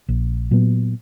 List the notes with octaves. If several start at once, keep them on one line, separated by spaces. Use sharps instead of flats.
A#1
A#2 F#3 B3